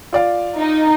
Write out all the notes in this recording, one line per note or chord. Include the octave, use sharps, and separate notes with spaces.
F4 D5 F5
D#4